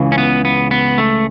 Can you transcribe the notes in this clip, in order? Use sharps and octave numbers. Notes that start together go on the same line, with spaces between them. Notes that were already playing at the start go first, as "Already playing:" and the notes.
Already playing: C#2 C#3 E3
C#4
B3
B3
B3
A3